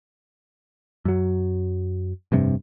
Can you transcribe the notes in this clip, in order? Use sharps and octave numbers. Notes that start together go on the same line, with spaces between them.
F#2 F#3
F1 G2 C3